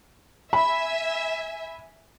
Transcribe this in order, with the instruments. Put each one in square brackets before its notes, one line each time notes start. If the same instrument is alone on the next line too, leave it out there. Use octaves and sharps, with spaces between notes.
[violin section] E5 G#5 [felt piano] B5